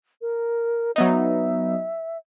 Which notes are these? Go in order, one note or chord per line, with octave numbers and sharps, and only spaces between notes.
A#4
F#3 B3 D#4 E5